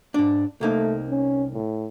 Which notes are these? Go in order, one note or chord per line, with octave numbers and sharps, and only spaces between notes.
G#2 D4
C2 A3 A#3 D#4
C#4
A2